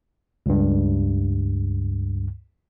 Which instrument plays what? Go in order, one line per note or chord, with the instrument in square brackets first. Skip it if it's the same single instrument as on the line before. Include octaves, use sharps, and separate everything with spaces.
[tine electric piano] C#2 G2